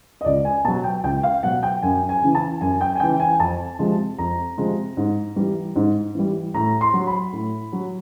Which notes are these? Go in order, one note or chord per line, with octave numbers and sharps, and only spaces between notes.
D#5
C#2 D5
G#5
B2 F#3 A5
G5
C#2 G5
F5
B2 F#3 F#5
G5
F#2 G#5
G#5
C#3 E3
A5
F#2 G#5
G5
G#5
C#3 E3 G5
G#5
F2 A5
C3 F3 G#3
F2 A#5
C3 F3 G#3
G#2
E3 G3
G#2
E3 G3
A2 A#5
C6
F#3
B5
A2
F#3